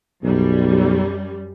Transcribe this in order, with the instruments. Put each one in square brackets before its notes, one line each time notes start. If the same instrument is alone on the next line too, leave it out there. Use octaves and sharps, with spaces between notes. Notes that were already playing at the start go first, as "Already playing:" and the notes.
[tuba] B1 [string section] F#2 G3